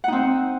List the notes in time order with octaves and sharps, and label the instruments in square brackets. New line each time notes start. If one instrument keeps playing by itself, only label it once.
[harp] F#5
D#4
C4